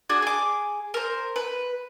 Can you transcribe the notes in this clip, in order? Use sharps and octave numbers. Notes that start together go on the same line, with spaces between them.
D4 F#4 G#4
G#4 D6
A#4 C5
B4